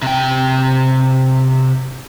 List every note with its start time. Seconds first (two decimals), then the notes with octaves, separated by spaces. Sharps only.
0.02 C3 G5